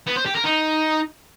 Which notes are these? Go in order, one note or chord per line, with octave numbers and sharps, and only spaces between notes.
B3
C5
G4
A#4
D#4